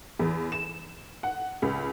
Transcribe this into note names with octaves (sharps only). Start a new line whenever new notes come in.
E2
E7
F#5
C#2